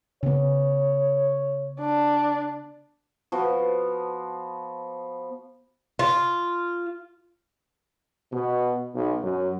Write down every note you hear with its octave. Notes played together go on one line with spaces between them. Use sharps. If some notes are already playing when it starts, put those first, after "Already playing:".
C#3 B3 C#5
D4
F3 B3 F#4
F4
B2
B1
F#2